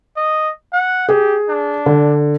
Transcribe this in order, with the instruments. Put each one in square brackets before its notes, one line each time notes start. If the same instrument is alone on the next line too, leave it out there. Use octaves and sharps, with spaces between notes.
[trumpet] D#5
F#5
[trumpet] G4 [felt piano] G#4
[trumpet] D4
[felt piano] D3